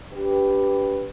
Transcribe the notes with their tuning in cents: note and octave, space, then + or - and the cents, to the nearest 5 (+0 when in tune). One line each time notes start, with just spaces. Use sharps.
D4 -35 G4 +0 B4 +0